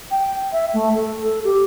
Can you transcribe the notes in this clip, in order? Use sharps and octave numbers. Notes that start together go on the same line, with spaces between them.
G5
E5
A3
A4
A4
G4